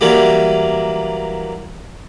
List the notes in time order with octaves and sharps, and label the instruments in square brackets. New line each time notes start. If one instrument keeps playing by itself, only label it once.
[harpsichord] E3 F#3 G3 A#3